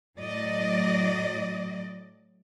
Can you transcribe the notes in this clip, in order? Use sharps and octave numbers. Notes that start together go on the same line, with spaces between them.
A2 F#3 D5 D#5